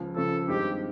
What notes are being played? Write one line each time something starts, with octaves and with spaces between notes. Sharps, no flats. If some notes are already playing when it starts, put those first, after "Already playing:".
Already playing: C#2 C#3 F3
C#2 C#3 F3 A4
G2 D#3 G#3 C4 G4